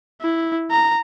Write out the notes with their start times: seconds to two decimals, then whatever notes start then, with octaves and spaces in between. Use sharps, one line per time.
0.21 E4
0.71 A#5